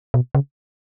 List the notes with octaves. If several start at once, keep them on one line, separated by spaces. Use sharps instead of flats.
B2
C#3